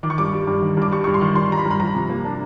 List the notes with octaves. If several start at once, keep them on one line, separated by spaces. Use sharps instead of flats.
D#3 D6
C#6
G2 D6
G3
G2
D#3
G2 D6
G3 C#6
G2 C#6
C6
D#3
G2 C6
G3 A#5
B5
G2
B5
F3 A#5
C3
A#3
D4